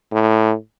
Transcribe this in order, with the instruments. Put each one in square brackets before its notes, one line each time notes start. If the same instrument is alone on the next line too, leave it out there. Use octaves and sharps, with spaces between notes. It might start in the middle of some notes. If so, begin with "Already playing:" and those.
[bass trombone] A2